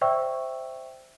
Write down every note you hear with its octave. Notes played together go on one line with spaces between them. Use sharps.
C5 D5 E5 G5 C#6 E6